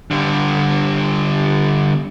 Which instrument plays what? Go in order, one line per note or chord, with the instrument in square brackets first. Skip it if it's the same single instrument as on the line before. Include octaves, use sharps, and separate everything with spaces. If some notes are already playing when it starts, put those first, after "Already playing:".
[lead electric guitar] D3 G3